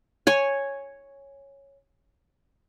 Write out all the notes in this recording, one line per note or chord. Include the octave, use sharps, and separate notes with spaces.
C#5 G#5